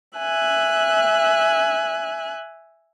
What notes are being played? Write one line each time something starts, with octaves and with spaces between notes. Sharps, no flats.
E5 G#5 F#6